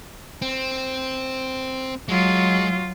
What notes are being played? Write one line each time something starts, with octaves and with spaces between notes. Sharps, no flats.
C4
F#3 G#3 F4